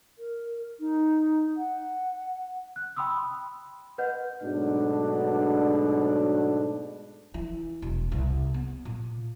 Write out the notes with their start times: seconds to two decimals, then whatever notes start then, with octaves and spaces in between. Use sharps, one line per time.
0.18 A#4
0.80 D#4
1.57 F#5
2.76 F#6
2.96 G5 B5 C6 D#6 E6
3.98 B4 D#5 F#5 G6
4.43 G#2 B2 F#3 A3 B3 D4
7.34 E3
7.82 E1
8.12 C2
8.54 B3
8.85 A#2